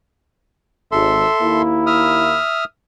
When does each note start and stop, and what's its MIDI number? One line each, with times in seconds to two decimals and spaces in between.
0.92 1.24 32
0.92 1.62 69
0.92 1.62 76
0.92 1.62 84
1.41 2.38 39
1.41 2.38 58
1.41 2.38 64
1.86 2.64 76
1.86 2.64 87
1.86 2.64 89